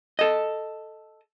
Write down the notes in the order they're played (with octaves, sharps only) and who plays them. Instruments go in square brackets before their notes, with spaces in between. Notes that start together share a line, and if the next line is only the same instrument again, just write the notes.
[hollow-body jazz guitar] A4 D#5